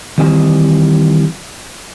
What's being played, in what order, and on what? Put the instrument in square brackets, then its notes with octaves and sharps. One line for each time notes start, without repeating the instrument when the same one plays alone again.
[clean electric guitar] D#3 E3 G3 C4 D#5 G#5